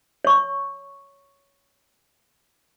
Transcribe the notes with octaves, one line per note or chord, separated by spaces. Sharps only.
C#5 C#6